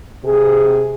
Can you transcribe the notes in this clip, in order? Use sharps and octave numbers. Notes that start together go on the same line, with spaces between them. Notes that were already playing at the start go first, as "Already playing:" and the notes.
C3 G#4